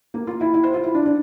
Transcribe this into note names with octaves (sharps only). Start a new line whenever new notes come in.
A#3
F4
E4
E4
C5
F4
E4
D4
D4